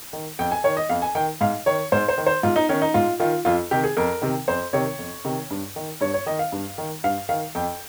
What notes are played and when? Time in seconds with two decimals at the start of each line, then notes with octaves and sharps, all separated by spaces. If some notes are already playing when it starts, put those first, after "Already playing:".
0.13 D#3
0.39 F2 G5
0.51 G#5
0.64 D#3 C#5
0.77 D#5
0.90 F2 F5
1.02 G#5
1.15 D#3 G5
1.41 G#2 F5
1.66 D#3 C#5
1.92 G#2 C5
2.09 C5
2.18 D#3
2.26 C5
2.43 G#2 F4
2.56 D#4
2.69 D#3 C#4
2.82 D#4
2.94 G#2 F4
3.20 D#3 F4
3.45 F2 F4
3.71 C3 D#3 G4
3.84 G#4
3.97 F2 A#4
4.22 C3 D#3
4.48 F2 C5
4.73 C3 D#3 C#5
4.99 F2
5.25 C3 D#3
5.51 G2
5.76 D#3
6.01 G2 C#5
6.14 C#5
6.26 D#3 D#5
6.39 F5
6.52 G2
6.78 D#3
7.04 G2 F5
7.29 D#3 F5
7.55 F2 G5